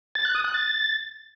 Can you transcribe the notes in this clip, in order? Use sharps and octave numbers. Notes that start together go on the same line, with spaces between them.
A6
F#6
D#6
F#6
A6